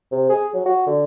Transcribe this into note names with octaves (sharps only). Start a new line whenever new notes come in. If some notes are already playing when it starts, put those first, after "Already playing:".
C3
G#4
F#3
F#4
D3